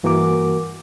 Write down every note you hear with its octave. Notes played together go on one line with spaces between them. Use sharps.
G2 E3 A#3 F#4 A#4 D6